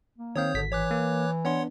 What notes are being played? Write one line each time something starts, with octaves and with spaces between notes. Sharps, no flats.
A#3
D#3 C4 C#5 F5 D#6 G6
G#1 D3 B6
E3 C#5 D6 F#6
A#3
B3 D4 C#5 F#5 C6